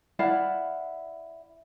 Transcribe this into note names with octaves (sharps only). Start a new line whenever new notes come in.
E4 D5 F5 F#5